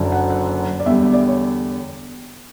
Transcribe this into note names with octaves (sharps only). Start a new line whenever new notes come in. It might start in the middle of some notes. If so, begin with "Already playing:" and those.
Already playing: F#1 F#2 D3
F#5
F#5
D5
E2 D3 G3 E5
D5
D5
C#5